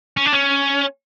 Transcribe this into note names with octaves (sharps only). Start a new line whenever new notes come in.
C#4
D4
C#4